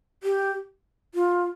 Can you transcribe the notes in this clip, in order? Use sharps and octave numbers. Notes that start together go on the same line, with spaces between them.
G4
F4